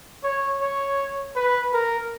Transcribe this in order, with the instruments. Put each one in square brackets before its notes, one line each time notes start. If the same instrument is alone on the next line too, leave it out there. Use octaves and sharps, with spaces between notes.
[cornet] C#5
C#5
B4
A#4